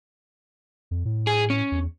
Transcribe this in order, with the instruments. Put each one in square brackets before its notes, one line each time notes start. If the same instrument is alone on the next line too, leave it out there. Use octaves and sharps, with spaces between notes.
[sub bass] F2
A2
[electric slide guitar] G#4
C#4
[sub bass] E2